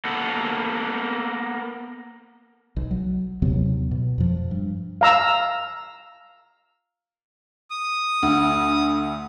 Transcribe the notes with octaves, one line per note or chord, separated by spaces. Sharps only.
A#3 B3 A4 A#4 F#5
B1
F#3
D#2 C3 F#3 B3
B2
F2 F3
G2
F5 A#5 E6
D#6
D2